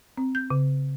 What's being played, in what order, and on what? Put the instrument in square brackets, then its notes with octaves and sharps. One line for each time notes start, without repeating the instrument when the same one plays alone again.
[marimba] C4
G6
C#3